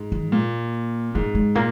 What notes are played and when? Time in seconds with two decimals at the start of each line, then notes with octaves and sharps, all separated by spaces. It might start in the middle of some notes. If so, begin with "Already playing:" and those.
Already playing: G#2
0.12 D#3
0.32 A#2 A#3
1.15 G#2 A#3
1.35 G#3
1.55 A#2 A#3